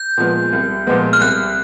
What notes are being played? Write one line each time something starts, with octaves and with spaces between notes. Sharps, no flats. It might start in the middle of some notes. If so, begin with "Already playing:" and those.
Already playing: G6
A#2 F3 G#3 B3
C2
A#2 F3 G#3 B3
F6
C2 F#6